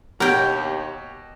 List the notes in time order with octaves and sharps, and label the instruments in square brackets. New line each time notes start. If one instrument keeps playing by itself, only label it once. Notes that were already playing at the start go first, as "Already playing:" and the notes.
[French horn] D#2 [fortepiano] B2 [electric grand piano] G4 C#5 F#5 [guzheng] A#4 G5